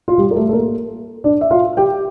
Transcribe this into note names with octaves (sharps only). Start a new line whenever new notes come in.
F4
G3 G4
A#4
A3 A4
A4
A#3 A#4
D4 D5
E5
F4 F5
G4 G5